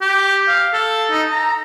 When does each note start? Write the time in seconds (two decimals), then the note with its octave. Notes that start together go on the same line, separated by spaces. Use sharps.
0.02 G4
0.48 F5
0.73 A4
1.11 D#4
1.31 A#5